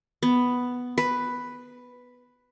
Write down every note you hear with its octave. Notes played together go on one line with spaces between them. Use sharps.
B3
B4